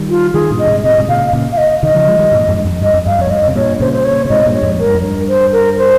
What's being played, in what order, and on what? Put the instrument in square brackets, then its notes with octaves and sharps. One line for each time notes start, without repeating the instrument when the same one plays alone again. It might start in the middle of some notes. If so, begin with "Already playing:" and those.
Already playing: [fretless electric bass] D#3 G3
[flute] F4
[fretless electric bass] D#3 G3 [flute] G#4
[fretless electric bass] G2 A#2
[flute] D#5
[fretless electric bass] G#2 C3
[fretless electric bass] C3 [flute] D#5
[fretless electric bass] A#2
G#2 C3
[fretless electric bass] A#2 C#3 [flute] F5
[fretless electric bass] A#2 C#3
[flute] F5
D#5
[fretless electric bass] C3 D#3 [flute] D#5
[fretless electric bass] C#3 F3
F3 G#3
D#3 G3
G2 A#2
F2 G#2
G2
F2
[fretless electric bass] G2 [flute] D#5
[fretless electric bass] F2
[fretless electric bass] G2 [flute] F5
[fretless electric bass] F2 [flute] C#5
[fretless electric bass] G#2
[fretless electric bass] G2 [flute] D#5
[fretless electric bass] C3
[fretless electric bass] G2 A#2 [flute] C#5
[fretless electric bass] A#2 C#3 [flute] C5
[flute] C5
C#5
[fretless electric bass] C#3
[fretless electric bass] G#2 C3 [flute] D#5
[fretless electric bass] G2 A#2
[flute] C#5
[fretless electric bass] F2 G#2
[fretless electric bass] G#2 [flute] A#4
[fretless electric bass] G2
F2
G2
[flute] C5
A#4
C5